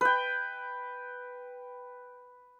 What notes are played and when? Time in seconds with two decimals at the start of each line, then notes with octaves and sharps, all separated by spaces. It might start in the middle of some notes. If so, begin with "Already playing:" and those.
0.01 B4 G5